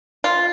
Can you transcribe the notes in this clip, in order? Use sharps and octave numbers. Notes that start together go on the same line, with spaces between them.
F4